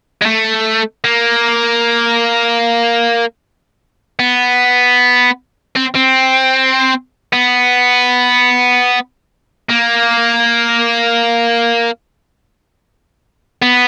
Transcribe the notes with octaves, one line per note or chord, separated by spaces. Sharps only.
G#3
A3
A#3
B3
C4
C4
B3
A#3
B3